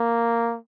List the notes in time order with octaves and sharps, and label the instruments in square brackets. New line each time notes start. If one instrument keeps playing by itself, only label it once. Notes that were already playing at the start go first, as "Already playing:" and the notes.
Already playing: [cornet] A#3